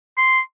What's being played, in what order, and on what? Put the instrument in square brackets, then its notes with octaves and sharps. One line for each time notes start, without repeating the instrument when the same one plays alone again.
[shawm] C6